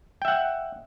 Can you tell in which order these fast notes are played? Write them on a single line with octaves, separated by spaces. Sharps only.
G5 E5 F#5